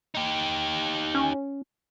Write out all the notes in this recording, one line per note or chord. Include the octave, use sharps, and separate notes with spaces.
D#4 G4
C#4